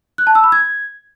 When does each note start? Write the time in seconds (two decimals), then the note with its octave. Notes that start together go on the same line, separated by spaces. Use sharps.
0.18 F#6
0.27 A5
0.35 E6
0.44 B5
0.52 G#6